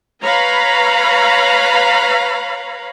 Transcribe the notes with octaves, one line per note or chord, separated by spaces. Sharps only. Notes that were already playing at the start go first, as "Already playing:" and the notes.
B4 C#5 F5 A#5 B5